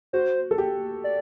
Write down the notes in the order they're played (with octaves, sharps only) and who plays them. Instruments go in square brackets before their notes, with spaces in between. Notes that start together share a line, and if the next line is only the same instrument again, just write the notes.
[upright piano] F#4 [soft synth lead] C5
[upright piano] A4
G4
[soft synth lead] D5